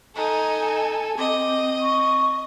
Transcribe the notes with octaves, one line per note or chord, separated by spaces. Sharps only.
D#4 A4 G#5
C4 D#5 D6
C#6